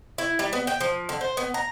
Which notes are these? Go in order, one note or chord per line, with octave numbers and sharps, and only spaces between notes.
E4
G3
B3
G5
F3
D3
C5
B3
A#5